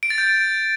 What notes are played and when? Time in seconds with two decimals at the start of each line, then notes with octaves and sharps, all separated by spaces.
0.03 D7
0.10 A6
0.18 G6